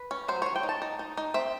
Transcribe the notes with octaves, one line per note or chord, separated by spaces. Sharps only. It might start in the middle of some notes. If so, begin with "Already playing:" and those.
Already playing: B4
C#4
F#3 C5
F#3 C#5
G5
D#4
A5
D#4
D#4
D#4
C4 E5